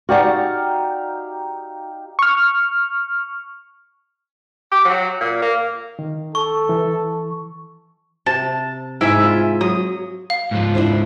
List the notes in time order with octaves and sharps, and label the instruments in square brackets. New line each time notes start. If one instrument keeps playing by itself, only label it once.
[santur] D#4 G4 F5 [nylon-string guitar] F#4 D5 F#5
[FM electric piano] C#6 F6
[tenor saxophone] G4
F#3
A#2
A#3
[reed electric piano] D#3
[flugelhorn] A4 [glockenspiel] C#6
[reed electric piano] E3
[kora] C3 [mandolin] A5
[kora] G#2 [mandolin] E4 E5 G#5
[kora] F4
[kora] F#3 [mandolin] D#6
[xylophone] F5
[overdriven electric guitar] G#2 F3
[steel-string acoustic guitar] D4 E4 C5